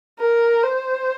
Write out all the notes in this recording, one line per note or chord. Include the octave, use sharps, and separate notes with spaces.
A#4
C5